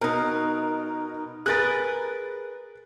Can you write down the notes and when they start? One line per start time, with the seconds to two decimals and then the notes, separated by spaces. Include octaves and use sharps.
0.01 B2 D#4 A#4
1.46 G#4 A#4 B4 F#6 A6